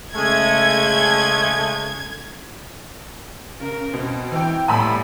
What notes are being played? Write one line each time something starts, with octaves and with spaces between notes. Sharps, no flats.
C#3 G#3 A3 G#6
C#3 A#4
B2 C4
E3 G5
A2 G3 B3 G#5 B5 E6